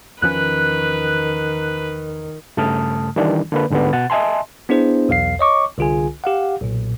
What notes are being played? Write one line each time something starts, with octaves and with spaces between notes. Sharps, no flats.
E2 D#3 F3 C#4 B4 F#6
G2 C#3 A3 A5 D#6 F6
D#3 E3 G3 D4
D3 A#3 B4
D2 G#2 D3 G3 B3
B2 F#5 A6
D#5 E5 G#5 A5 C6
B3 D4 E4 G#4 C5
B1 E2 F5 C7
C#5 D#5 C#6 D6
C2 D3 F4 G#4 G#5
G4 F5 F#5
B1 A#2